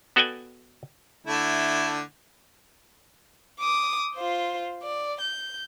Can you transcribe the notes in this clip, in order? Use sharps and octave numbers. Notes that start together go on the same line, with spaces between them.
B3 F#4 A4 D5 G5 G#5
D3 A3 E4
D6 D#6
F4 C5
D5
G6